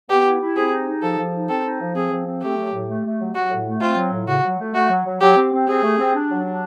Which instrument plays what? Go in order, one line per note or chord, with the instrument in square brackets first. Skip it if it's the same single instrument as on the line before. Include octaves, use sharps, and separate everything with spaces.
[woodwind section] B3 [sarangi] G4
[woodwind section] E4
E4
[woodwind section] C4 [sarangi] G#4
[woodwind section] D#4
D#4
[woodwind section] F3 [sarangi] A4
[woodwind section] F3
D#4
[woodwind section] C4 [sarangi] A4
[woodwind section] D#4
F3
[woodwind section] C4 [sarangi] G#4
[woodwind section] F3
C4
[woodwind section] A3 [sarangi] G4
[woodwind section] F#3
A2
A3
A3
F#3
[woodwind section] F#3 [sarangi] F#4
[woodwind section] A2
A3
[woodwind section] C4 [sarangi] F4
[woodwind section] F#3
A2
[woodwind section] C#3 [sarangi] F#4
[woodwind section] F#3
A3
[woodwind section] A3 [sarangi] F#4
[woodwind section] F#3
F#3
[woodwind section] F#3 [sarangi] G4
[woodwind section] C4
C4
[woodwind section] C4 [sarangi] G#4
[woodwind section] A3
C4
D4
F#3
D4